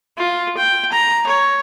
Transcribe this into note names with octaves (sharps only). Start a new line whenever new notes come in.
F4
G5
A#5
C#5